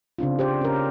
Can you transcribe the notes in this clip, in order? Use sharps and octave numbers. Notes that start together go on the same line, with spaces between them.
C#3 C4 D4 F4
G4 C5 D5
C#4 A#4